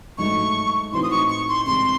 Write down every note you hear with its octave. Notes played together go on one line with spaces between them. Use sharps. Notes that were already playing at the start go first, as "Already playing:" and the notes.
G#2 F#3 A3 C#6
A2 E3 C4 D#4 F#4 C6
D#6
C#6
C#6
C6
C2 C3 E3 G#3 C6